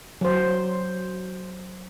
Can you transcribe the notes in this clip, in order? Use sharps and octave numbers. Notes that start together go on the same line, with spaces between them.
F#3 C5